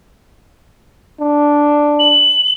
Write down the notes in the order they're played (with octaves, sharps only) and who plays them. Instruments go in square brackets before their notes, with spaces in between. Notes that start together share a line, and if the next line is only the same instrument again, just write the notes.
[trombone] D4
[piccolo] F#7